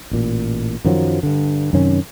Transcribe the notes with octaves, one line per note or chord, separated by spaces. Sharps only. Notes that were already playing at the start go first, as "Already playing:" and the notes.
A1 A#2
F#2 D#3 F3 F#3
G2 D3
F#2 C3 D#3 C#4